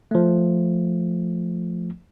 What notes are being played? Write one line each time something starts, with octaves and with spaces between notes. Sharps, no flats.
F3 A3